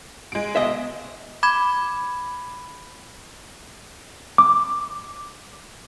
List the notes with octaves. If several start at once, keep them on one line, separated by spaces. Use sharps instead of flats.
G#3 D7
B2 D#5 E5
B5 D6 G#6
D6